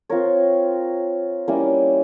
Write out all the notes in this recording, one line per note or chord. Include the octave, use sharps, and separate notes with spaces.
C4 F4 A#4 C#5
G3 A#3 C#4 E4